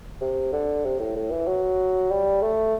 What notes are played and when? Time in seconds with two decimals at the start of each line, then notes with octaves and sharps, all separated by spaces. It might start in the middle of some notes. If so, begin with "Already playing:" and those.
0.21 C3
0.52 D3
0.85 C3
0.99 A2
1.16 A2
1.31 E3
1.47 F#3
2.11 G3
2.42 A3